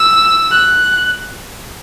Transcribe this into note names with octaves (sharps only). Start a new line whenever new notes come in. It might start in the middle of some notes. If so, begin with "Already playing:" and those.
Already playing: E6
F#6